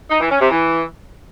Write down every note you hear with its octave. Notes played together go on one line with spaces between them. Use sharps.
D#4
E3
C#4
C3
E3